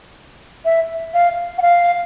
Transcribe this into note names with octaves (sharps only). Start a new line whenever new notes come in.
E5
F5
F#5
F5